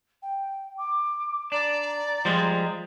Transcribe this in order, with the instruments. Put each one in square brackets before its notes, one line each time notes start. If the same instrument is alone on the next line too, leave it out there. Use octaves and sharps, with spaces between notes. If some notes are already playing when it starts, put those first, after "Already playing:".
[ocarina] G5
D6
[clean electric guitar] D4 [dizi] D5 [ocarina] A#5
[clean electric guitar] F3 G3 G#3